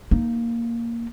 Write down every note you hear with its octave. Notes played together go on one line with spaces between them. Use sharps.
A#3 D#4